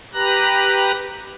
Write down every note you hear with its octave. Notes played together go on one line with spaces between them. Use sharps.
G4 B4 A#5 F#6 A#6